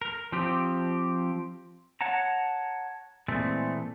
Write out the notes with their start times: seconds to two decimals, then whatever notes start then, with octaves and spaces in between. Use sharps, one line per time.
0.02 A#4
0.32 F3 C4 G4
2.01 C#5 F#5 A5 A#5
3.28 A#2 E3 G#3 A3 C4